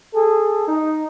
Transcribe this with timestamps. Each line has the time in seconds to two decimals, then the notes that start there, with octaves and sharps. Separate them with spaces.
0.14 G#4 A4
0.68 D#4